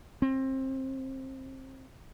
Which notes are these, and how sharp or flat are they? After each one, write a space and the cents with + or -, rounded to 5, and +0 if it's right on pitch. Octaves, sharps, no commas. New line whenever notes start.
C4 +25